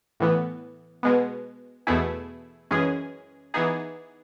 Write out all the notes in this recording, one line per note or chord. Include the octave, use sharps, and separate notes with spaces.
A2 E3 B3
B2 G#3 B3
E2 B2 A3 E4 G#4
F#2 E3 G#3 C#4 G#4
E3 B3 D#4 G#4